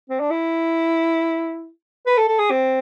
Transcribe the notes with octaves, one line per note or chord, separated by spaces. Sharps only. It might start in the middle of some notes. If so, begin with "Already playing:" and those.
C4
D4
E4
B4
A4
A4
G#4
C4